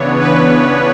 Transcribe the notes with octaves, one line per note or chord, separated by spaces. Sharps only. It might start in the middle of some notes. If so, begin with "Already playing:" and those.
Already playing: C#3 E3 B3 D4 C#5
B4